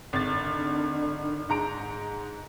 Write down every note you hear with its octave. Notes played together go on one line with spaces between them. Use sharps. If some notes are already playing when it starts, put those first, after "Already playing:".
G#1 D3 A6
G#2 A#5 D7